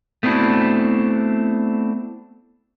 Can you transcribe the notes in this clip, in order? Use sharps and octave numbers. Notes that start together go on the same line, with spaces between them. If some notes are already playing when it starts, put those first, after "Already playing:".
A3 B3 C4 D4 E4 F#4